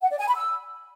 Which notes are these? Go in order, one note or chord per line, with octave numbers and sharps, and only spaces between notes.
F#5
D5
G#5
B5
E6